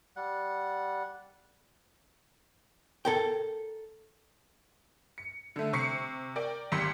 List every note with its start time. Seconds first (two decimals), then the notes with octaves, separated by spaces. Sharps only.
0.16 G3 F#5
3.05 A4 A#4 G5
5.18 C#7
5.56 D3 A3
5.73 C3 C#6 C7 C#7
6.36 A#4 D5 G5
6.72 G#1 D#2 G4 C6 C#7